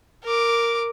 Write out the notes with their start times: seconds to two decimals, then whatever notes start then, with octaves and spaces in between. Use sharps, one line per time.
0.24 A#4 D6